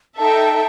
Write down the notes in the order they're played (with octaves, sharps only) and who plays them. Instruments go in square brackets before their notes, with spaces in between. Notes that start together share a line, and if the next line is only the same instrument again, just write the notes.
[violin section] D#4 A4 E5 G5 [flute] A5